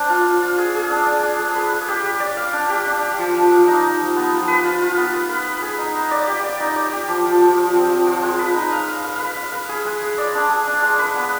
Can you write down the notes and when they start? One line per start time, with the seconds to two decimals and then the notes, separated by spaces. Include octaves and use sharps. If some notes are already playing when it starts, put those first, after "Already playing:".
Already playing: D4 C5
0.10 F4
0.25 F4
0.42 F4
0.58 G#4
0.74 G#4
0.90 D4
1.06 D4
1.23 D4
1.39 G#4
1.55 B4
1.72 G#4
1.88 G4
2.04 G4
2.20 D5
2.37 F5
2.53 D4
2.69 G4
2.86 D4
3.02 G4
3.19 F3
3.34 F3
3.51 F3
3.68 D#4
3.83 D#4
4.00 F3
4.16 B3
4.32 F3
4.48 B4
4.64 F4
4.81 F4
4.97 B3
5.14 B4
5.29 B4
5.46 B4
5.62 G#4
5.78 D#4
5.95 D#4
6.11 D5
6.27 G4
6.43 D5
6.60 D#4
6.76 D5
6.92 G4
7.08 F3
7.25 F3
7.41 F3
7.57 F3
7.74 C4
7.89 F3
8.07 F3
8.22 G#3
8.39 B4
8.54 D#4
8.72 F5
8.88 F5
9.04 F5
9.19 B4
9.37 F5
9.52 B4
9.69 G#4
9.85 G#3
10.02 G#3
10.18 D5
10.35 D4
10.50 G#4
10.67 D4
10.82 G#3
10.99 B4
11.15 B3